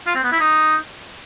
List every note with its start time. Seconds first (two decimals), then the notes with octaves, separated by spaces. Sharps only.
0.07 F4
0.15 C4
0.24 B3
0.32 E4
0.40 D#4